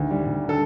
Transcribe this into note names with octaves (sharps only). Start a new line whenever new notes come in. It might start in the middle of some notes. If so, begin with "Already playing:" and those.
Already playing: D2 D#3
G3
D2
D3
A4